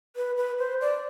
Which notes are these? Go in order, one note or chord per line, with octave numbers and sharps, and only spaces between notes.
B4
B4
C5
D5